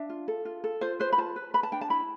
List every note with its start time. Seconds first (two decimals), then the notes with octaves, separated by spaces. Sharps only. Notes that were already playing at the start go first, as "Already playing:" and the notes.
Already playing: D4 E5
0.09 F4
0.28 A4
0.45 F4
0.64 A4
0.81 F4 C5
1.00 B4 C5
1.13 B5
1.18 F4 A5
1.36 B4
1.54 B4 B5
1.63 A5
1.72 D4 G5
1.81 A5
1.90 E4 B5